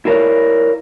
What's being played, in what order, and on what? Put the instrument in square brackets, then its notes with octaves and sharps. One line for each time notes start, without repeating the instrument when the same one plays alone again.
[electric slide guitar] E4 F4 A#4 C#5 D5